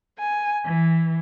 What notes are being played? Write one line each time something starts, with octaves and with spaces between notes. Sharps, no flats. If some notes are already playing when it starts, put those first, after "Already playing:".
G#5
E3